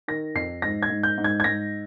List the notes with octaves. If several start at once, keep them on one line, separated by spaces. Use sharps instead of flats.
D#3 A#6
F2 C7
G#2 A#6
G#6
G#2
G6
G#2
G#6
G#6
G#2 A#6